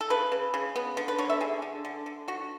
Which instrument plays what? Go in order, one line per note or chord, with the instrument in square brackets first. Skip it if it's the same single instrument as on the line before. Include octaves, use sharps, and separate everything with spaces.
[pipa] A4
C#3 B4
C#3
C#3
B3
D3
B4
D3 C#5
E5
D3 G#4
D3
D3
D3
D3 F#4